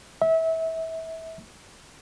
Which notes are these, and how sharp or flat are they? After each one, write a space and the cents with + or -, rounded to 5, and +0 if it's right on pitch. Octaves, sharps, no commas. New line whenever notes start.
E5 -25